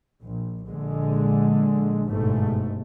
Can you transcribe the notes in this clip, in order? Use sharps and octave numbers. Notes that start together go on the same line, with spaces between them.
A#1
A#1 D3 G#3
G1 G#2 B2 A3